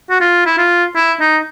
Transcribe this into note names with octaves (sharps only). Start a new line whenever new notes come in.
F#4
F4
E4
F4
E4
D#4